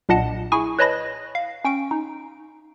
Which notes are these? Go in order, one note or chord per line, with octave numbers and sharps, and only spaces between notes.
B1 A#2 D4 D#5 F#5 A5
E4 G#4 G#5 C#6
B4 C#5 D#5 A5 B5 A#6
F5
C#4 G5 C#6 D7
D#4